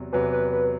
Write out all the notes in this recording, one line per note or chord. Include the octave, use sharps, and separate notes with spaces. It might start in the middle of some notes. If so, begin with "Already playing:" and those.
Already playing: E2 C3 F#3
E2 C3 F#3 B4
B4
B4